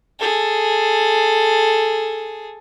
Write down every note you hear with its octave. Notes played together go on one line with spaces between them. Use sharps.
G#4 A4